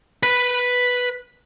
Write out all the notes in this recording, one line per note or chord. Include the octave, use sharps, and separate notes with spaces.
B4 B5